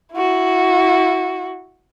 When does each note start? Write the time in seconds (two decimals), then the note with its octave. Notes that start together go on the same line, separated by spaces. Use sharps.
0.14 E4 F#4